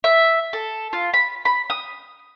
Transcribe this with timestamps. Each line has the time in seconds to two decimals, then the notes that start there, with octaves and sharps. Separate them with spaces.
0.04 E5
0.53 A4
0.93 F4
1.14 B5
1.45 B5
1.70 D#6